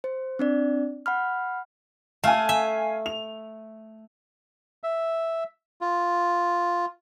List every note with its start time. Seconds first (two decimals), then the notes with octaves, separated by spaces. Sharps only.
0.04 C5
0.39 C4 D4 D5
1.06 F#5 B5 F6
2.24 A3 F5 G#5
2.49 E5
3.06 F7
4.84 E5
5.81 F4